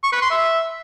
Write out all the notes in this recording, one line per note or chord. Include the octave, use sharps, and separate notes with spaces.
C#6
B4
C6
E5